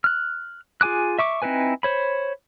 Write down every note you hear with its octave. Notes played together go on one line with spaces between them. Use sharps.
F6 F#6
F4 G#4 G#5 D6 F#6
E5 C#6 D6
C4 D#4 E4 B4 G#5
C5 C#5 B5